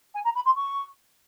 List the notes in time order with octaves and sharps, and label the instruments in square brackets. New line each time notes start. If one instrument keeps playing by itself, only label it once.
[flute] G#5
A#5
B5
C6
C#6